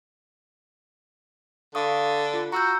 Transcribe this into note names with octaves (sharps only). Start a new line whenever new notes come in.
D3 F5 C#6 D#6
F4
F#4 A#5 E6 G6